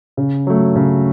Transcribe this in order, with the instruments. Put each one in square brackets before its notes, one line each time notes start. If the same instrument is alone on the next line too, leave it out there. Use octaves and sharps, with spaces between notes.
[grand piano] C#3
F#3 A3
C#3